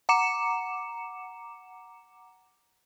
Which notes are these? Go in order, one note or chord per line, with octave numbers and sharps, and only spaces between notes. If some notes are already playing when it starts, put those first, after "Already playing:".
F#5 A#5 D6 C#7 E7